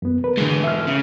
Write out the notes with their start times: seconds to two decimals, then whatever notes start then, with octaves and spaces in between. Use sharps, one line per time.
0.02 F#2 B3
0.24 A#4 B4
0.37 G#2 D3 E3 G#3
0.64 E5 F6
0.87 C#3